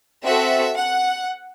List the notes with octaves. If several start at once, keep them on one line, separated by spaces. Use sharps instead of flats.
C4 F#4 A4 E5
F#5